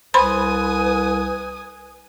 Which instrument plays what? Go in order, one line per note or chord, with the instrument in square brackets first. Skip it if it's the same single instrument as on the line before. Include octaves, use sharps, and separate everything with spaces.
[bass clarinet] C2 [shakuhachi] B4 [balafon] C5 B5 C6 [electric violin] G#5 D#6